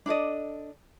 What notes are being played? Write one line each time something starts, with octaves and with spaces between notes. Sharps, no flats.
D4 A4 D5 D#5